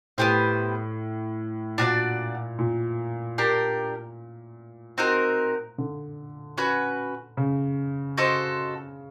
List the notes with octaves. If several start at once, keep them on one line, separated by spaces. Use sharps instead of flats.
A2 B3 D4 G4 C5
A#2 D4 F#4 A#4 D5
A#2
D4 G4 A#4
C4 D#4 F#4 A#4
D3
C#4 F#4 B4
C#3
F#4 A4 C5 D#5